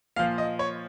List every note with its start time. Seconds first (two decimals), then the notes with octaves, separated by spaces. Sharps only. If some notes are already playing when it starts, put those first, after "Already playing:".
0.16 A#2 F3 F5
0.38 D#5
0.59 C#5